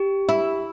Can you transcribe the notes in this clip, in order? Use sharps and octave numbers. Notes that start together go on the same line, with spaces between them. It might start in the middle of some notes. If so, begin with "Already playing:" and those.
Already playing: G4
E4